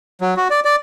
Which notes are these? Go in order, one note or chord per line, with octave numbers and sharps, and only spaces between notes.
F#3
F#4
D5
D5